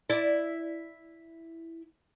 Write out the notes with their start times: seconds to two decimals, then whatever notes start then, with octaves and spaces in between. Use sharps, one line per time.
0.10 E4 D5